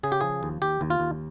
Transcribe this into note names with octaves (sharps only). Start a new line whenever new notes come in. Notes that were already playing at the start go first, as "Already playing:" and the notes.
C#3 G#4
G4
F3 G#4
D#2
D#2 G4
D#2
F4
D#2